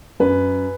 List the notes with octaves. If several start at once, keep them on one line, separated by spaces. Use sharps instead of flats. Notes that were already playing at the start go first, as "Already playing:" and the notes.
F#2 B4